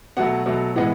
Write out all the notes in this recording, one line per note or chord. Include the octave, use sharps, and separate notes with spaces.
B2 F#3 A3 F#5
B2 F#3 A3
A2 E3 G#3 B3 F#5